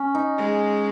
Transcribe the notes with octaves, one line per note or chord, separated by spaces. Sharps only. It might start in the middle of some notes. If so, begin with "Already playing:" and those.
Already playing: C#4
D#4
G#3